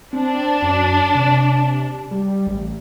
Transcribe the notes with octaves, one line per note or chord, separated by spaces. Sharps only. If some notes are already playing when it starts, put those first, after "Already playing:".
C4 D4
F#2
C3
G3
A1